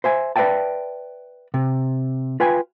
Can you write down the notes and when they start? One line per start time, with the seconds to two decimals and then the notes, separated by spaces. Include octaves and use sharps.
0.04 C5 E5 G#5
0.36 B4 D5 E5 G5 A5
1.54 C3
2.40 F4 B4 G5 G#5